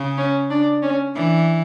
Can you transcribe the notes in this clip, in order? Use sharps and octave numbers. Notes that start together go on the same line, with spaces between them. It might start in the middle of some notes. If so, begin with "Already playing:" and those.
Already playing: C#3
C#4
D4
C#4
E3 D4